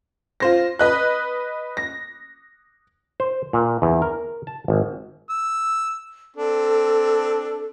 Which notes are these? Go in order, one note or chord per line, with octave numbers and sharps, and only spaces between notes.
F4 C5 A#6
B4 D#5 F#6
A#6
C5
A#2
E2
A#4
A5
G#1
E6
C4 D4 A4